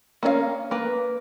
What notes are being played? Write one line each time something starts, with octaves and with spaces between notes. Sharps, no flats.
A#3 C#4 D5 F5
A#3 B4